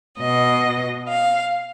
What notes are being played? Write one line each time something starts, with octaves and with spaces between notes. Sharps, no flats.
B2 D#5
F5